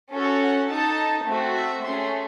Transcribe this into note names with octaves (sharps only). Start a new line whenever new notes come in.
C#4 F#4 A4
F#5
D#4 A4 A5
A3 C4 F#4
E5
A3 C#4 G#4 C6